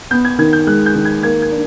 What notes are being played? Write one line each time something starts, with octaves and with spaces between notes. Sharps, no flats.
B3 G6
G#6
D#3 G#6
G6
G#3 F#6
G6
D#3
G#6
A#3 G#6
G#6
D4